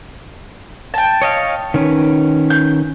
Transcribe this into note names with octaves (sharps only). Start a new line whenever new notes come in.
G5 A5
C#5 D#5 F5
D#3 C#4 B4
G6